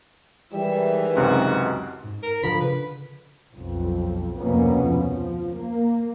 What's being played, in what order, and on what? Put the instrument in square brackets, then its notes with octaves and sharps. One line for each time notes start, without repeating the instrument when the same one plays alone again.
[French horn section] G#2 D#3 E3 [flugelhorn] G3 [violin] E5
[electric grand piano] C#2 F#2 C3 [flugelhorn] D#4 [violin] F#4
[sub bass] G#2
[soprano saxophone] A#4
[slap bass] D3 F3 [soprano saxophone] B5
[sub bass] C#3 [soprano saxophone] B4
[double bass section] B1 F2
F1 D2 B2 A#3 B3 C#4
F3
A#3